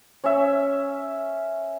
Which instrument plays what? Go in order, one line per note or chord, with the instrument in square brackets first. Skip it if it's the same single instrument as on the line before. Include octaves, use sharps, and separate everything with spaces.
[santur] C#4 E5